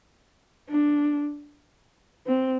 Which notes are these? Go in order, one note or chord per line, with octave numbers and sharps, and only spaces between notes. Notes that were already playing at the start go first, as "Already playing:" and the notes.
D4
C4